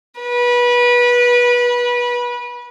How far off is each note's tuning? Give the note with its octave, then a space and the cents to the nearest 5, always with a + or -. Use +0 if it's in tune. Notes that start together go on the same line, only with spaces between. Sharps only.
B4 -25